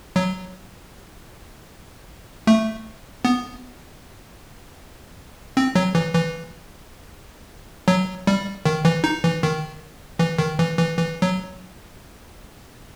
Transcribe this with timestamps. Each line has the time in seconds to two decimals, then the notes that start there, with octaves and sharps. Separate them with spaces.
0.16 F#3
2.47 A3
3.25 B3
5.57 C4
5.75 F#3
5.95 E3
6.14 E3
7.88 F#3
8.27 G3
8.65 D#3
8.85 E3
9.04 D#4
9.24 E3
9.43 D#3
10.19 E3
10.39 D#3
10.59 E3
10.78 E3
10.97 E3
11.22 F#3